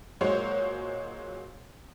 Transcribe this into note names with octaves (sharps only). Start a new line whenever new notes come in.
A#2 F#3 G#3 C5 C#5 F#5